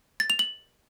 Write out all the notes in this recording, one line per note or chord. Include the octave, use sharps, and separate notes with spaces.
A6
F7
F#7